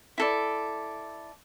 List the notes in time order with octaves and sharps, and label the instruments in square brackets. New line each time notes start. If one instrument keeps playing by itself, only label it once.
[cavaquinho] E4 A4 D5